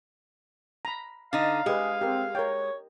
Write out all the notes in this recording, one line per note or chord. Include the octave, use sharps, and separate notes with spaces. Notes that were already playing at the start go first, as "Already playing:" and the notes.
A#5 B5
D3 D#4 F5
G#3 G4 G#4 B4
C4 G4 A#4
A#4 C#5 G5